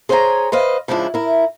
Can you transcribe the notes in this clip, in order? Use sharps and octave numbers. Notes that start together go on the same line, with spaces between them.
G#4 C5 C#5 F5 G#5 A#5
B4 C5 D#5 F5
C#3 F3 G#3 D4 E4
E4 A#4